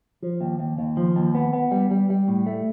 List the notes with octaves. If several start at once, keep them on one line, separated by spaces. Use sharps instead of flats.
F3
D#2
D#2
D#2
F3
D#2
B3
B3
G3
G3
G3
A2
A3